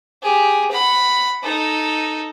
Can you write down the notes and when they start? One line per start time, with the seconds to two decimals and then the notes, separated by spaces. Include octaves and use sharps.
0.22 G4 G#4
0.71 F#5 B5
1.43 D#4 A4